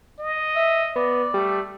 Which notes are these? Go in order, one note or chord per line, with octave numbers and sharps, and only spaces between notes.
D#5
E5
B3 D5
G3 A3